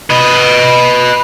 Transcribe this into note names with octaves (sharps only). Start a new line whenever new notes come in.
B4 D#5